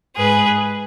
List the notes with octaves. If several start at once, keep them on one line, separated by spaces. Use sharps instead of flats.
G#2 G#4 B4